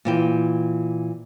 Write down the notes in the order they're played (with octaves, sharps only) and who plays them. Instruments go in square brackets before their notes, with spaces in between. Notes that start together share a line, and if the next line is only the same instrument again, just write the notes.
[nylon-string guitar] A#2 E3 G5